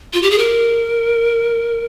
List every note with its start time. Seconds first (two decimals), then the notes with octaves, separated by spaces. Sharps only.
0.13 F4
0.23 G4
0.31 G#4
0.38 A#4